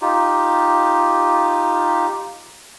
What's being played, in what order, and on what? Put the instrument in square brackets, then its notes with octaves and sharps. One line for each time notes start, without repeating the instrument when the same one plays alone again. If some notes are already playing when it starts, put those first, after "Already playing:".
[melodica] D#4 F4 G4